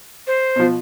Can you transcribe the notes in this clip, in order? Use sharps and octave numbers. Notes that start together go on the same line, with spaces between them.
C5
B2 F3